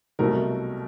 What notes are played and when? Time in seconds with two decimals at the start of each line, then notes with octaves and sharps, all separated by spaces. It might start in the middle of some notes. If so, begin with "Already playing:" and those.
0.19 C2 B2 F#3 A3 A#4